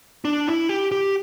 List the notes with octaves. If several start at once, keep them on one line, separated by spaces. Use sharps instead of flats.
D4
E4
G4
G4